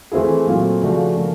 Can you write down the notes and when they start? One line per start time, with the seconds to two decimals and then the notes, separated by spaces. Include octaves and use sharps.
0.12 E3 A3 C4 E4 G#4
0.47 A#2 F#3 A3 C4
0.81 C#3 F3 A3 D4 F#4
1.14 C#3 F3 A#3